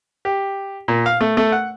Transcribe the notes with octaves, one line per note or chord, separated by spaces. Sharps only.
G4
A#2
F5
A3
A3
F#5